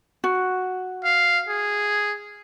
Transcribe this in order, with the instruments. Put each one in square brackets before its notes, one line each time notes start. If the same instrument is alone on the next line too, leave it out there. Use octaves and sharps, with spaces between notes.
[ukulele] F#4
[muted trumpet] F5
G#4